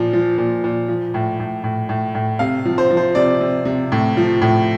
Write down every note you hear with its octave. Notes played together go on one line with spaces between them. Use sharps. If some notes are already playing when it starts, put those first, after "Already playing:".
Already playing: A#2 F3
F3
A#2
A#2
F3
A2
A2
A2
A2
A2
C3 F5
F3
C5
F3
C5
C3 D5
C3
C3
A2
F3
A2